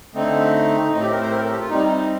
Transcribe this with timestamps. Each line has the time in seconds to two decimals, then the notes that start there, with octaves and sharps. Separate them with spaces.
0.14 D3 A3 C4 D#4
0.92 A2 A3 C4 D#4
1.01 G4
1.11 A#4
1.21 C5
1.31 A#4
1.40 A4
1.50 G4
1.60 F4
1.69 C3 G3 C4 D#4
1.88 D#4